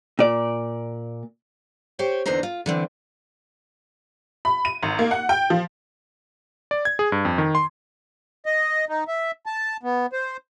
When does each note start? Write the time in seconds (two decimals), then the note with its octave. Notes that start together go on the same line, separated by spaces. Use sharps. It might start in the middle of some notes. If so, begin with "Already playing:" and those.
0.19 A#2 D5
1.99 G4 C5 C#5 G5
2.26 E2 D3 E3 D#4 C5 A#5
2.43 F4
2.66 D3 E3 C4
4.45 B5
4.65 D#7
4.83 G#1
4.99 A#3
5.11 F#5
5.29 G5
5.50 F3
6.71 D5
6.85 G#6
6.99 G#4
7.12 G2
7.25 F2
7.38 D#3
7.55 C6
8.46 D#5
8.89 D#4
9.08 E5
9.46 A5
9.83 B3
10.13 C5